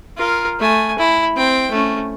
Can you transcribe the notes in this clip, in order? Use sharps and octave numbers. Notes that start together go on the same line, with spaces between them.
F4 A#4
A3 G#5
E4
C4 G5
A3 C#4